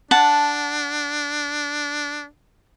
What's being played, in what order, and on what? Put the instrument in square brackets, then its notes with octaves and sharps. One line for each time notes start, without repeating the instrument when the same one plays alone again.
[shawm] D4 [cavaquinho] F#5 A5